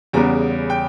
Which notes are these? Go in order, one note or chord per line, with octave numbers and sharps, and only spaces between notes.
E2 C#3 G3 B3 A#5
G5